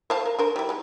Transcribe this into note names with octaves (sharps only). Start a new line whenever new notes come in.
C5 F5 A5
A#4
D4 A#4 C5
G3 E4
G#3 D#4